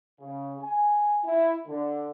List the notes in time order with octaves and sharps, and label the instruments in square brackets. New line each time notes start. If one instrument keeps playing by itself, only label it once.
[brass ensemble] C#3
G#5
E4
D3